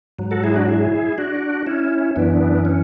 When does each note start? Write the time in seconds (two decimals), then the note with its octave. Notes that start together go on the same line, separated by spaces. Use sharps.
0.19 G#2 F#3
0.31 F#4 A4
0.43 E4 G#4
0.56 D4 F#4
0.68 E4 G#4
1.18 D4 F#4
1.66 C#4 E4
2.16 F#2 E3 B3 D4
2.65 C#4